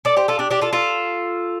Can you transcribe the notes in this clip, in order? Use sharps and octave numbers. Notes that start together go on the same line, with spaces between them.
A4 D5
G4 C5
F4 A4
D4 G4
D4 G4
F4 A4
F4 A4